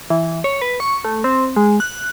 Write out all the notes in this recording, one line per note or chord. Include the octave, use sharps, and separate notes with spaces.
E3
C#5
B4
C#6
A3
C4
G#3
F#6